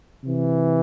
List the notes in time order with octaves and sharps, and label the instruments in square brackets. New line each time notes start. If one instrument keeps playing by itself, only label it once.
[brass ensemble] C3 E3